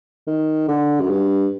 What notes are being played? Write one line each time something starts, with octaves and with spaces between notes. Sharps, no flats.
D#3
D3
F#2
G2